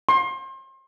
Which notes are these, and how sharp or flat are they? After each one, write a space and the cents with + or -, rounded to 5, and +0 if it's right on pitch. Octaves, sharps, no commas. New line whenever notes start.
C6 +35